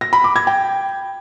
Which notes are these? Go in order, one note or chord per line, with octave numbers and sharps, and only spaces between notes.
A#6
B5
D6
G#6
G5